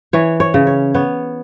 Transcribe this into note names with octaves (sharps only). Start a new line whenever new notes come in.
E3 C#5
C#5
C#3
C#5
B3 C#5